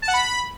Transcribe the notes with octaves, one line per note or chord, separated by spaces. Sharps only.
A5
F#5
B5